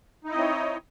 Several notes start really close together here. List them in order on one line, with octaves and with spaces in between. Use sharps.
D#4 E4 D#5 C4 C#5